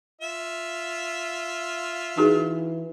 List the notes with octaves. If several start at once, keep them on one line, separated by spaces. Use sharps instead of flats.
F4 E5
E3 D#4 F#4 G#4